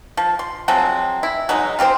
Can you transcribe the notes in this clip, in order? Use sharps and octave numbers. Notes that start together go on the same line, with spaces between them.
F3
C6
F3 F#3 G#3 C4
E4
F#3 G#3 D#4
F4 G4 A4 C5